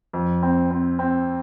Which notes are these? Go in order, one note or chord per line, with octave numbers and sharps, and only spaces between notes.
F2
C4
C4
C4